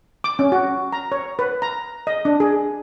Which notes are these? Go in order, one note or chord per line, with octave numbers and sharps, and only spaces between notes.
D6
C#4
F#4
A#5
C#5
B4
A#5
D#5
D4
G#4